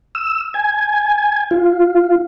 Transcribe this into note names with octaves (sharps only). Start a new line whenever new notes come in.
E6
G#5
F4